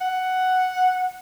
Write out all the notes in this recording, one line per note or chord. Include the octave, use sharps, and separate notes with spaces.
F#5